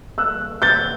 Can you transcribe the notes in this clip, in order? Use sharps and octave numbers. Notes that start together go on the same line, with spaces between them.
E6 F#6
G6 A6